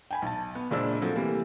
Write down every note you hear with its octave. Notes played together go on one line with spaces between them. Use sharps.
G5 G#5 B5
B1 A5
B3
F#1 A#2 G#3 D4 C5 E6
F3 F#3 A3 C4
C3 E3 G3 A3 A#3